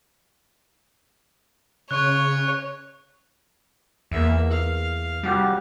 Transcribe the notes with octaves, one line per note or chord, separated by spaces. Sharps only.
C#3 C#5 C#6 F#6
E2 A#3 E5
F5
C2 G3 F#4 G4